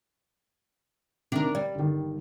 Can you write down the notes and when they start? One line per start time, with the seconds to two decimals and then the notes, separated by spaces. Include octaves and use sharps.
1.32 C3 D#3 D4 A#4
1.55 G3 D5
1.75 G1 D#3